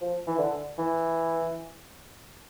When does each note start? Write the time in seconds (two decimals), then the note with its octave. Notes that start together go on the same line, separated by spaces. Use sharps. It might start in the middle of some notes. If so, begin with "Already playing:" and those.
0.01 F3
0.27 E3
0.38 D3
0.78 E3